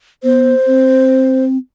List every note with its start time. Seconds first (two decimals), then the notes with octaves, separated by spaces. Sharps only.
0.23 B3 C5
0.67 C4